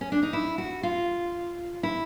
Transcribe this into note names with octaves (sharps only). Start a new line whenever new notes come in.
C#4
D4
D#4
E4
F#4
F4
E4